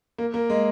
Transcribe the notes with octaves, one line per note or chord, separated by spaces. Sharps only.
A#3
A#3
G#3